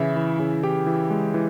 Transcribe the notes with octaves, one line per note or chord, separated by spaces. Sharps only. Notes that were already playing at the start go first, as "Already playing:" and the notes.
Already playing: C#3 E3 E4 E5
E3
C#3
E3 G4 G5
E3
G#3
E3